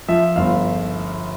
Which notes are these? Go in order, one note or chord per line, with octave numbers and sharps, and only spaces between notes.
F3 E5
G1 F5